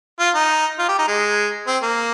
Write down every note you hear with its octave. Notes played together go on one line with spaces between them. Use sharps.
F4
D#4
F4
G4
D#4
G#3
C4
A#3